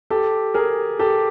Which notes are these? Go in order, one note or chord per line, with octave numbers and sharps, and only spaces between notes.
G4 A4
G#4 A#4
G4 A4